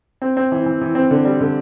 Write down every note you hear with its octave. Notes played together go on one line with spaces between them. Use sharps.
C4
C4
E3
E3
E3
C4
D3
G3
D3